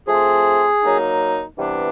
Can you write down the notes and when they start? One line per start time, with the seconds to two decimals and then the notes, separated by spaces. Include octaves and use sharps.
0.07 F3 A3 C4 G#4
0.82 F#3 A#3 D#4
1.57 C3 E3 G3 B3 D4